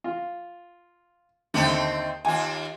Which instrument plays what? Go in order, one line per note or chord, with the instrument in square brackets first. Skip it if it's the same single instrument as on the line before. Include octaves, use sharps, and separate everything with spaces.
[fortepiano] F4
[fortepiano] D#2 D3 [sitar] A3 C4 D#4
[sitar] D#2 F4 [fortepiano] G#5